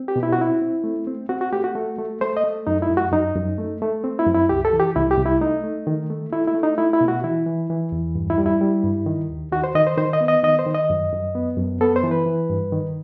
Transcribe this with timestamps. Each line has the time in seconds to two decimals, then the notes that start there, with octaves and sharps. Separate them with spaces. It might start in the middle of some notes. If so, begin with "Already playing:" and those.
Already playing: C4
0.08 G4
0.16 B2
0.23 E4
0.33 F#4
0.39 C4 E4
0.61 C4
0.84 A3
1.07 C4
1.29 C4 F#4
1.41 F#4
1.52 A3 G4
1.64 F#4
1.75 A3
1.99 A3
2.21 A3 C5
2.37 D#5
2.44 A3
2.67 F#2 D#4
2.82 E4
2.90 F#2
2.97 F#4
3.12 F#2 D#4
3.35 F#2
3.58 A3
3.82 A3
4.04 C4
4.19 E4
4.27 F#2
4.34 E4
4.49 C2 G4
4.65 A4
4.73 E3
4.80 G4
4.96 C2 E4
5.11 G4
5.18 C2
5.26 E4
5.40 A3 D#4
5.64 A3
5.87 D#3
6.10 A3
6.33 A3 E4
6.48 E4
6.55 A3
6.63 D#4
6.78 A3 E4
6.93 E4
7.01 B2
7.08 F#4
7.24 E3 E4
7.46 E3
7.70 E3
7.92 E2
8.15 G2
8.30 E4
8.38 G3
8.46 E4
8.61 G3
8.84 G2
9.06 D#3
9.30 D#2
9.52 D#3 F#4
9.64 C5
9.75 D#3 D#5
9.87 C5
9.98 D#3 C5
10.13 D#5
10.21 B3
10.28 D#5
10.44 D#3 D#5
10.59 C5
10.67 D#3
10.74 D#5
10.90 F#2
11.13 F#2
11.35 B3
11.57 F#2
11.81 B3 A4
11.96 C5
12.04 E3
12.11 B4
12.26 E3
12.50 G2
12.72 D#3